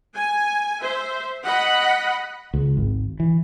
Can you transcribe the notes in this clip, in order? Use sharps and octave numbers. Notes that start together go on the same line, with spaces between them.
G#5
C5 E5
D#5 F#5 B5
C#2
G#1
E3